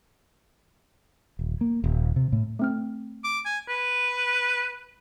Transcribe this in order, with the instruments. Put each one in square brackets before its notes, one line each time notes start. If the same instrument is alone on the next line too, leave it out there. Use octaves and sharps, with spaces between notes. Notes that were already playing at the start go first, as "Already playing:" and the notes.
[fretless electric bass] D#1
A#3
D#1
C3
A2
[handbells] A3 C4 F6
[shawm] D6
G#5
B4